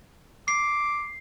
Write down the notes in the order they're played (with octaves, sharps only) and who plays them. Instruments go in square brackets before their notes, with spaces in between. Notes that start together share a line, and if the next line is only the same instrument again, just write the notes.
[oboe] D6 [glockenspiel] C7